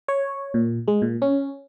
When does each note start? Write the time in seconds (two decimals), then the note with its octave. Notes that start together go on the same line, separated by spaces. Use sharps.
0.08 C#5
0.54 A#2
0.88 G#3
1.02 A#2
1.22 C#4